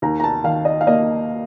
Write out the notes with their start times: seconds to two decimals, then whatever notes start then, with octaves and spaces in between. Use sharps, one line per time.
0.02 D#2 A#5
0.20 A#5
0.24 A5
0.44 D#3 F5
0.65 D#5
0.81 F5
0.87 A#3 D#5